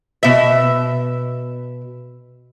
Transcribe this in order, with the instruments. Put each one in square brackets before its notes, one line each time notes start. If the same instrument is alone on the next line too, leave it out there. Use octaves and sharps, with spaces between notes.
[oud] B2 E5